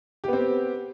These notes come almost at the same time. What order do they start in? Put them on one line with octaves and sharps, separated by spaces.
G4 B3 C4